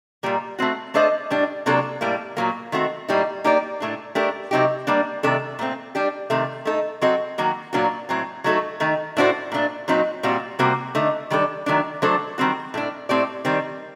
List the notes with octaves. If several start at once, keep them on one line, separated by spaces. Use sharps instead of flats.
A#2 G3 A#3
A3 C4 F#4
A3 D4 A4 C5 D#5
A2 G3 D4
C3 F#3 A#3 D4 A4
A2 G3 A#3
A#2 F#3 A#3
D#3 A3 C4 F#4
A2 G3 A#3 D#4
A#3 D#4 G4 D5
A2 A3 D4
A3 D4 G4 A#4
C3 F#3 C4 D#4 G4
G3 A#3 D4
C3 D#3 A3 D4 A4
A#2 A3 C4
G3 D4 G4
C3 D#3 A3
A3 D#4 A4
F#3 C4 F#4 A4 D#5
D#3 F#3 A#3 F#4
A#2 F#3 A#3 D4 F#4
A2 F#3 C4
F#3 A3 D#4 F#4 A4
D#3 A3 D#4
A2 A3 D4 F#4 C5
A#2 A3 D4
A#2 F#3 C4 D#4
A#2 G3 C4 F#4
C3 G3 A#3 F#4 C5
D3 A3 D#4
D#3 G3 D4 A4
D#3 F#3 A3 D4
F#3 A3 D4 A4 C5
D#3 G3 C4 F#4
A2 A3 D4
A2 A3 C4 G4 D5
D#3 G3 C4